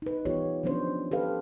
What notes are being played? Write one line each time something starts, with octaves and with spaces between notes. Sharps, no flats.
D#4 B4
E3 B3 F4 G4 C#5
F3 F#3 B3 C#4 D4 C5
G4 A4 B4 F5